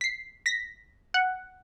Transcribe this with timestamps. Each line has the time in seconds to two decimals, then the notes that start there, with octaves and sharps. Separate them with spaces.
0.01 B6 C7
0.46 A#6 B6
1.14 F#5